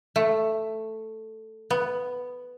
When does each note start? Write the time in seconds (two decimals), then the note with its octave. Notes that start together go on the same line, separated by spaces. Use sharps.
0.16 A3
1.70 B3